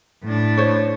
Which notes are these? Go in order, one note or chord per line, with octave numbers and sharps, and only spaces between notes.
A2 D4
C5 C#5